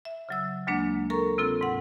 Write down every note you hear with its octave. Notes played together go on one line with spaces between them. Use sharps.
E5
C#3 F#3 E6
D2 F#3 G#3 A#3 D4
A4 A#4 A#5 C#6
C3 C4 F4 A4
G#2 F#5